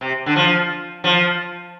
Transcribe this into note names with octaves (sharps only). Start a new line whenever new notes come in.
C3
D3
F3
F3